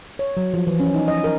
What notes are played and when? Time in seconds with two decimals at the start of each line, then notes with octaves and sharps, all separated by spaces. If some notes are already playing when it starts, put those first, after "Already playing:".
0.19 C#5
0.37 F#3
0.54 F3
0.67 E3
0.80 C#4
0.95 D#4
1.08 D#5
1.24 A#4